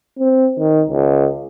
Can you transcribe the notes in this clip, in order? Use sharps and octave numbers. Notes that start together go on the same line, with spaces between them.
C4
D#3
C#2